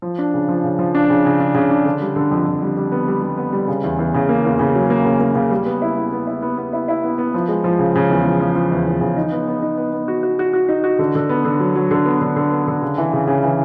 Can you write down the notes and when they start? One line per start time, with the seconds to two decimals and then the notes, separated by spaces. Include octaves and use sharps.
0.02 F3
0.18 D4
0.34 C#3
0.49 F3
0.64 C#3
0.79 F3
0.95 D4
1.10 C#3
1.25 C#3
1.40 D4
1.55 C#3
1.71 D4
1.85 D3
2.01 G3
2.16 D3
2.31 F2
2.47 F2
2.62 G3
2.77 G3
2.92 B3
3.08 G3
3.22 G3
3.38 B3
3.53 G3
3.68 C#3
3.84 E2
3.99 E2
4.14 C#3
4.29 A#3
4.45 E2
4.59 C#3
4.75 F#3
4.90 A#3
5.05 C#3
5.21 A#3
5.35 C#3
5.51 G3
5.66 B3
5.82 E4
5.97 B3
6.13 B3
6.27 E4
6.42 B3
6.58 B3
6.73 E4
6.88 E4
7.04 B3
7.18 B3
7.34 F3
7.49 G#3
7.64 F3
7.79 C#3
7.95 C#3
8.11 E2
8.26 F3
8.40 F3
8.56 F3
8.72 E2
8.87 E2
9.01 C#3
9.17 D#4
9.32 B3
9.48 B3
9.62 D#4
9.78 B3
9.93 B3
10.08 F#4
10.23 F#4
10.39 F#4
10.54 F#4
10.69 D#4
10.84 F#4
10.99 D3
11.15 D3
11.29 B3
11.45 D3
11.60 F#3
11.75 F#3
11.91 D3
12.06 B3
12.21 D3
12.36 D3
12.51 B3
12.67 D3
12.82 C#3
12.98 E3
13.13 C#3
13.27 C#3
13.43 E3